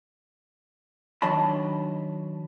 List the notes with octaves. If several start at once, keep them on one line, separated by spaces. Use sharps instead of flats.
D#3 F#3 D4 D#5 A5 B5